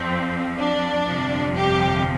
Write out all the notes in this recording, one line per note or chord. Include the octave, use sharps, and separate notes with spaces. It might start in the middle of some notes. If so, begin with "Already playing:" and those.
Already playing: F2 F3 C4
D4
G1 F2 C3 F3
G4